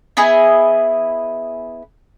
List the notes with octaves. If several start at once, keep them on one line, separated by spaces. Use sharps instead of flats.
B3 E4 G#4 D#5